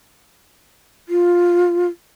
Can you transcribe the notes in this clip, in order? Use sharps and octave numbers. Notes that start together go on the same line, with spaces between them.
F4